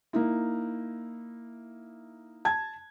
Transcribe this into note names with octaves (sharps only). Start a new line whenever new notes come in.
A#3 D#4 E4
A5 G#6